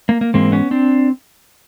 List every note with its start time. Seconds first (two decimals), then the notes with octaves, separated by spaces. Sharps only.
0.09 A#3
0.21 A#3
0.34 G#2 E3 G#3 A#3 C4
0.52 B3 C#4
0.71 C4 D4